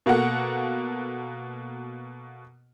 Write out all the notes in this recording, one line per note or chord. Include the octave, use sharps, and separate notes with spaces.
B2 A#3 F#4 A4 F#5